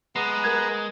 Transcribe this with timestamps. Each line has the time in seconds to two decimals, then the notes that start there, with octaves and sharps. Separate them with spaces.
0.16 G#3 B3 B4 A#5 C7
0.44 A#4 F#6 G#6